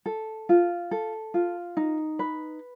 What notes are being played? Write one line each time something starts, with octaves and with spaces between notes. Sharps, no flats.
A4
F4
A4
F4
D#4
B4